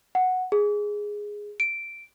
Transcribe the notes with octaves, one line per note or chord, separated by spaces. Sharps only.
F#5
G#4
D7